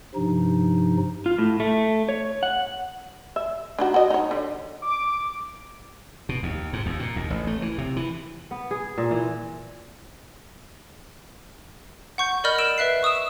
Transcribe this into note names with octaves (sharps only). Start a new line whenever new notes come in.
G2 C3 F3 D#4
F4
A2
A3
C#5
F#5
E5
D4 D#4 F#4
F#4 D#5
D#4 C#5
D3
D6
B2
D#2
G#2
D#2
A#2
D#2
A1
A3
E3
C3
E3
B3
G#4
A#2
E3
F#5 C#6 G6
A#4 D5 D#5 B5 F6 G6
E6 D7 E7
B4 E5 F#6 C7
C#6 D#6 E6 E7